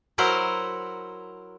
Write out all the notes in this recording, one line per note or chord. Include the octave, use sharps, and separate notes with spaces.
F#3 E4 F#4 A#4 C5 F#5